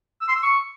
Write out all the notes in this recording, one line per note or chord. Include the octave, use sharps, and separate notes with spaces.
E6
C6
E6
C#6